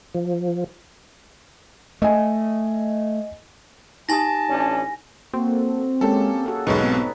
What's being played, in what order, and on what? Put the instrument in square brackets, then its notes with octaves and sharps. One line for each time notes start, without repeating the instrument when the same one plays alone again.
[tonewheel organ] F3
[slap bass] A3 [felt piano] D#5 G#5
[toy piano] D#4 G4 D#6 [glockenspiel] G#5 A#6 [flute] A5
[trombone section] A1 C#4 D4
[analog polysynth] A#3 A4 [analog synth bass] C4 [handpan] F#4
[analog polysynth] G#3 [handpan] A#3 C#4 G4 [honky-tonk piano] A4
[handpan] F#4 A4 [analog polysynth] G#4 F#5
[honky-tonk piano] B1 G#2 B2 [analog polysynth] E2 G#4 [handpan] D#4 B4 C#5
[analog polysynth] B3 C4 A5